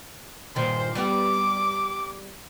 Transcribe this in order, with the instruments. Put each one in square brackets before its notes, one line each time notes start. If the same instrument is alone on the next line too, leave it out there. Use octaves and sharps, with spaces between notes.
[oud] G2 A#2 D#3 [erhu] C5
[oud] G3 B3 G4 [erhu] D6